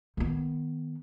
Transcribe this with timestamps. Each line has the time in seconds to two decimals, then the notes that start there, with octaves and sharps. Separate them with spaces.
0.17 D#3 B3